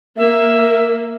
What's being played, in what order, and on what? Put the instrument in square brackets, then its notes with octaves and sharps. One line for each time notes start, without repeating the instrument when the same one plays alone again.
[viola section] A#3 [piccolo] E5